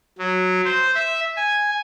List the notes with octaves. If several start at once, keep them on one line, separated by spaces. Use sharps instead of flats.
F#3
C5
E5
G#5